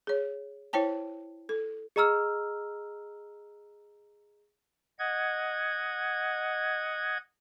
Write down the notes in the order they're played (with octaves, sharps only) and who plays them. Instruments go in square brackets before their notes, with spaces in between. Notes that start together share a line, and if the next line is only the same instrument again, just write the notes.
[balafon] G#4 C#5
E4 C5 C#5 G5 A5
A4
[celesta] G#4 D#5 A#5 E6 F6
[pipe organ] D#5 F#5 G#6